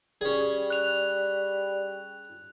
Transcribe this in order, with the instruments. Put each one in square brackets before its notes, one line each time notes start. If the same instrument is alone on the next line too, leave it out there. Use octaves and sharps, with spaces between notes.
[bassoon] G3 [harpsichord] C#4 G#4
[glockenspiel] F#6 F7